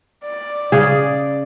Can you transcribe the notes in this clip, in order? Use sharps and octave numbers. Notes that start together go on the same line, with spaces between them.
D5
C#3 G#4